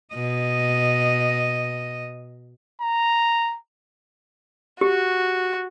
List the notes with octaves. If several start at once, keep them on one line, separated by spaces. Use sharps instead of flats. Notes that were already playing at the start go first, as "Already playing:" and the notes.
B2 D#5
A#5
F#4 G4